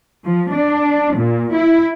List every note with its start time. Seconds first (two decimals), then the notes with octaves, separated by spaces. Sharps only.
0.24 F3
0.53 D4
1.14 A#2
1.54 E4